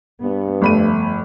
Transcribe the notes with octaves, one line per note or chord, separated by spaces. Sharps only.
G2 B3
G1 F2 A3 B5 D#7